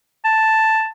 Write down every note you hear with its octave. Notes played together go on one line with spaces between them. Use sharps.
A5